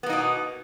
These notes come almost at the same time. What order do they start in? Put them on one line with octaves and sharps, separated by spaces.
B3 A#3 D#4 B2